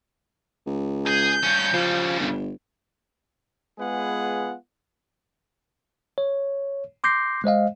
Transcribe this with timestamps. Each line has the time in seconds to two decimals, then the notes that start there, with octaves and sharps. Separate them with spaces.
0.66 C#2
1.07 G#4 G6
1.44 G2 C#4
1.74 C#3 F3 G3
2.19 G1
3.79 G#3 B3 F4 G#4 B4 F#5
6.18 C#5
7.04 C6 D6 G6 A#6 C7
7.44 G#3 C5 D#5 F5